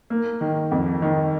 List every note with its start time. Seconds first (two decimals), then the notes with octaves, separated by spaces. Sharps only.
0.10 A#3
0.41 D#3
0.71 F2
1.02 D#3